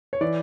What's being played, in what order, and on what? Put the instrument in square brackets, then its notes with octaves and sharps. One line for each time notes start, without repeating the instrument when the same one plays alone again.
[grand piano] C#5
E3 D5